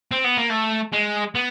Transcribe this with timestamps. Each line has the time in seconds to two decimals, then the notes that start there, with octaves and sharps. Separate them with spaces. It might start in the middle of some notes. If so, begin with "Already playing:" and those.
0.12 C4
0.24 B3
0.37 A#3
0.50 A3
0.93 G#3
1.35 B3